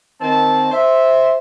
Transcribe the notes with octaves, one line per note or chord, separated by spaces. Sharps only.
D#3 C4 A5
C5 E5